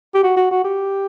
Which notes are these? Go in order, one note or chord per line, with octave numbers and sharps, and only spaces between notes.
G4
F#4
F#4
F#4
G4